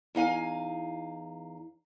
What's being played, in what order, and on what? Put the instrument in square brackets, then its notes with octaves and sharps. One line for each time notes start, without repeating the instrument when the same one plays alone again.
[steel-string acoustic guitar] E2 D#4 F5 G#5